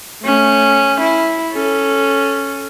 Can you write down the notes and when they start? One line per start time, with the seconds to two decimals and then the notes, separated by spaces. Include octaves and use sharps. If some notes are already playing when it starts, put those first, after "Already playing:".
0.23 A3 C#4
1.00 E4
1.52 C#4 A4